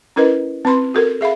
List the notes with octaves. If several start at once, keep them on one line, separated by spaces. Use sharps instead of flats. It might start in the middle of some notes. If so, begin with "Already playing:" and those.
C#4 E4 A#4 B4 D#5
C4 B4 B5 C6
F#4 A4 A#4
G#4 E5 F5 B5